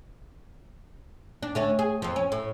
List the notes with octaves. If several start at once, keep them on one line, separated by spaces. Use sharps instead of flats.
D4
D3 A3 C#4
G#4
F2 F3
C#4
A2